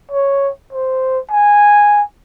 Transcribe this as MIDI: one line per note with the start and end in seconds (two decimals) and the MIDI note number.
0.12 0.50 73
0.73 1.19 72
1.31 2.02 80